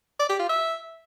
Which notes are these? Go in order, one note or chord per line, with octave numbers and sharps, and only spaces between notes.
D5
G4
F4
E5